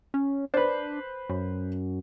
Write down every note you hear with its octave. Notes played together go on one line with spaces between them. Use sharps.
C#4
D4 B4 C5
F#2